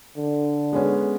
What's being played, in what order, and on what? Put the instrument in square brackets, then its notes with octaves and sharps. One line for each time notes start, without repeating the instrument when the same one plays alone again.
[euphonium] D3
[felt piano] G#3 B3 C#4